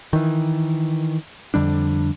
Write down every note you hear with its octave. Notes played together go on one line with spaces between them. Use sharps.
D#3 E3
F2 D3 G3 D4